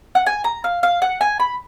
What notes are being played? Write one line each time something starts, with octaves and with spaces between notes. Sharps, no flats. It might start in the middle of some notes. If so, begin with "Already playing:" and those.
F#5
G#5
A#5
F5
F5
F#5
G#5
B5